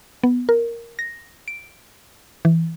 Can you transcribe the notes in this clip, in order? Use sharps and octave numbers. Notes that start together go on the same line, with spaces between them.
B3
A#4
A#6
D7
E3